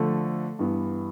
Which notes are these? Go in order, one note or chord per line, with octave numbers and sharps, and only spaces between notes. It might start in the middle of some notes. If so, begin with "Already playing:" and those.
Already playing: D3 F3 A3
G2 E3 B3